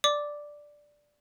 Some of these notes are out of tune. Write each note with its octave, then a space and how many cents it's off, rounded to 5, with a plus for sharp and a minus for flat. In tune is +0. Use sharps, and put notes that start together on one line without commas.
D5 +0 D6 +0